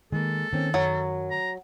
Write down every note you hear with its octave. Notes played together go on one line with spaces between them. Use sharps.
D#3 G#3 A#3 A4
D#3 A#3 C4 C#4
F#2 F#3
A#5